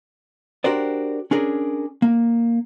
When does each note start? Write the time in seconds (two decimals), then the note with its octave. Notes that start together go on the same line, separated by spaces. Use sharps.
0.64 D4 F#4 G4 A#4 C5 D5
1.31 C#4 D4 G#4 A#4
2.02 A#3